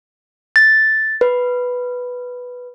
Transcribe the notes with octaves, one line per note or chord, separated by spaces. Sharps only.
A6
B4